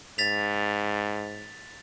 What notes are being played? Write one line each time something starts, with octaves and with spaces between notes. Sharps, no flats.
G#2 A6 B6 F7